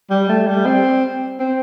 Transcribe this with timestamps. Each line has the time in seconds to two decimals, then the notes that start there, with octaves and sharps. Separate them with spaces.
0.10 G3
0.29 A3
0.47 G3
0.66 C4
1.40 C4